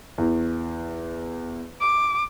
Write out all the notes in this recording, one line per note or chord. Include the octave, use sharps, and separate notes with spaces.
E2
D6